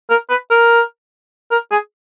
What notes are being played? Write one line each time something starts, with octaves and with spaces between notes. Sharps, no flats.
A#4
B4
A#4
A#4
G#4